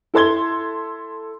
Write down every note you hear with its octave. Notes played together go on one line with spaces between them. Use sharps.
E4 A4 C6 G#6 G7